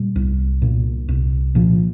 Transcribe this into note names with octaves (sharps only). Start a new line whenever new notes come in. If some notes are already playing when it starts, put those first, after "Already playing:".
Already playing: A#2 G3
C2
A#2
C2
A#2 F3